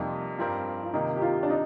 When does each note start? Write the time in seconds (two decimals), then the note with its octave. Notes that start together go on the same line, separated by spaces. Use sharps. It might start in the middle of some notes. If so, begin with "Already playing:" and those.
Already playing: F2 C3 G3 A#3 D#4 F4
0.38 G2 F3 C4 G4 A#4
0.83 F4
0.94 C3 D#3 A#3 D#4
1.17 G4
1.22 F4
1.43 D4
1.50 D#4